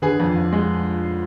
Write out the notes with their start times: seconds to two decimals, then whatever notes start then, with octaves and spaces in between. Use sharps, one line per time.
0.02 D3 G#4 B4
0.20 F2
0.36 F2
0.53 G#3